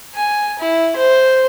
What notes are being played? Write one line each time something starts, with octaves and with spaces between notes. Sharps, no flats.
G#5
E4
C5